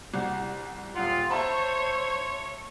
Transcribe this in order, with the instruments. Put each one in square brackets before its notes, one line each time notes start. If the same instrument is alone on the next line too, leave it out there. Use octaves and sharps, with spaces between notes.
[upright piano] C2 F#4
[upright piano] D#1 F#5 [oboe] F4 [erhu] F5
[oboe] C5 [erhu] C#5 [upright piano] E5 A5 B5